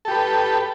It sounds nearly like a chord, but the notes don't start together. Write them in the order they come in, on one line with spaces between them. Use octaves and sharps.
A4 G4 B4